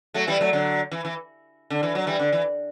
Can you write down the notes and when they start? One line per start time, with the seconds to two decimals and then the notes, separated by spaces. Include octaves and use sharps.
0.14 F#3 A3
0.27 E3 G3
0.41 F#3 A3
0.53 D3 F#3
0.91 E3
1.05 E3
1.70 D3
1.83 E3
1.95 F#3
2.07 E3 G3
2.19 D3
2.33 E3